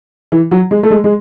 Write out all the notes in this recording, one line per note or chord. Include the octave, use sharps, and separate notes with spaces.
E3
F#3
G#3
A3
G#3
G#3